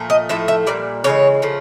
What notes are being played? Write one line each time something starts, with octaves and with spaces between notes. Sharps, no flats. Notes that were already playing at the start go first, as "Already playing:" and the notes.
Already playing: A#2 F3 A3
D#5
A2 F3 A3 E5
E5
A#2 G3 D5
C#3 E3 G#3 C#5
C#3 F3 A3